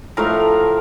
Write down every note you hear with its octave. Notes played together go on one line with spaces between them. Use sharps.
A2 F3 A3 A#4